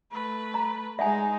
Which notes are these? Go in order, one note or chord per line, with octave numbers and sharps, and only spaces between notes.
A3 B4
A#5
G#3 D#4 E5 F#5 G#5